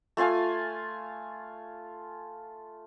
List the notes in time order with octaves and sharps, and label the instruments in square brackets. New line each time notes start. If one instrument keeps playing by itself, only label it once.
[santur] A3 F4 F5 G#5